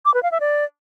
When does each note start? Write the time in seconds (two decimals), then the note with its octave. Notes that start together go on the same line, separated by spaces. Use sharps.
0.05 D6
0.14 B4
0.23 F5
0.32 E5
0.40 D5